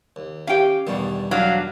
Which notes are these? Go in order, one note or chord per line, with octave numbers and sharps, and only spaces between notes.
D#2
C#4 G4 F5 G5
E2 G2 B2 D#3 G3
F#3 D4 F5